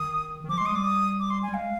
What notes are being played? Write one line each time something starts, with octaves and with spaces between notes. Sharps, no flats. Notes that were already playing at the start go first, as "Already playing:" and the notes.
Already playing: D#3 D#6
D#3
F3 D6
C6
G#3
D#6
G3 D6
D#6
D6
C6
G#5
G3
G#3 F5